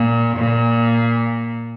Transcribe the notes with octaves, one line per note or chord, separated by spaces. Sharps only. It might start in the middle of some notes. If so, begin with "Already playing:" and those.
Already playing: A#2
A#2